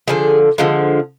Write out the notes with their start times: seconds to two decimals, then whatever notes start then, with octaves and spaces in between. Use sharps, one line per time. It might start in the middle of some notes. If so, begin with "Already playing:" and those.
0.08 D3 F3 G#3 G#4
0.58 D3 F3 G#3